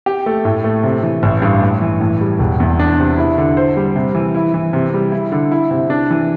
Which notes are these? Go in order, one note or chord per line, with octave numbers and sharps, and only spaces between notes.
G4
A3
A2
A3
C3
E3
A1
G2
A2
E3
A2
G3
E1
E2
D4
C3
E4
D3
C5
G3
C3
E3
E4
E3
C3
G3
E4
D3
E4
C3
D4
E3